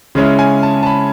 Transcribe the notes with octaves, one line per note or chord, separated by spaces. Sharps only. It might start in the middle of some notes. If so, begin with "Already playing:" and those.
C#3 G#3 C#4 E4
G#5
A5
A5
B5